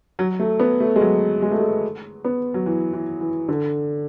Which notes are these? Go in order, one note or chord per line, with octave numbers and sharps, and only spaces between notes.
F#3
A3
B3
A3
G#3
F#3
G#3
A3
G#3
B3
F#3
E3
E3
E3
D3